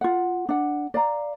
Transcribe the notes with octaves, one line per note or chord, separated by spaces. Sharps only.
F4 F#5
D4 F#5
D5 F5 A#5